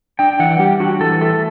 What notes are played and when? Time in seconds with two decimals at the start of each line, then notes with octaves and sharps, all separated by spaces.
0.19 D4 G5
0.40 E3 F#5
0.59 G3 G4
0.80 D4 F#4
1.00 E3 A4
1.21 A3 A4